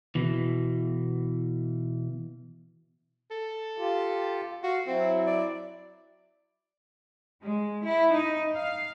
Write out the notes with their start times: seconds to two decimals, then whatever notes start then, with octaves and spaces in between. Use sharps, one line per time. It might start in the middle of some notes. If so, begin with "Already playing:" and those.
0.15 B2 E3
3.30 A4
3.78 F4 G4
4.63 F#4 F5
4.87 F#3 C4 E4
5.27 D5
7.42 G#3
7.83 E4
8.12 D#4
8.55 F5